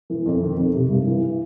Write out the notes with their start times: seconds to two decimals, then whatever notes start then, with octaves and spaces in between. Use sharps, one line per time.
0.10 E3
0.26 F2
0.42 D#3
0.58 F2
0.74 C3
0.90 G2
1.06 E3